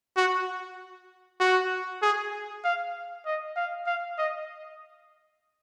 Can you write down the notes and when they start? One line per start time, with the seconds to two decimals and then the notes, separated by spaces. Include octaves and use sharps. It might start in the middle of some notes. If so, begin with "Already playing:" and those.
0.16 F#4
1.40 F#4
2.02 G#4
2.64 F5
3.26 D#5
3.56 F5
3.86 F5
4.18 D#5